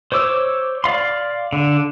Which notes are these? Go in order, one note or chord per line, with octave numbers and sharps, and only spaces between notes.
C5 C#5 D6 E6
D5 F5 C6
D3